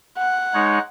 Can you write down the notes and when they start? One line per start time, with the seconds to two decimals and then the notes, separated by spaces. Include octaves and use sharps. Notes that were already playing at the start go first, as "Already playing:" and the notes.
0.18 F#5
0.54 G#3 D#4 C#5